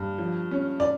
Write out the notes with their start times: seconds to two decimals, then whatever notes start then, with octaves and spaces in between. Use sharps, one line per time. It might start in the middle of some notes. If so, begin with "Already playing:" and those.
Already playing: G2
0.18 F3
0.51 C#4
0.80 D5